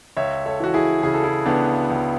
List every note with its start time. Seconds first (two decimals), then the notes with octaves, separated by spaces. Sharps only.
0.17 C#2 C#5 E5
0.46 A4 C#5
0.60 E3 F#4
0.74 E4 G#4
1.03 C#3 G#4
1.14 A4
1.23 E4 G#4
1.46 C#2 B3 D4
1.90 C#2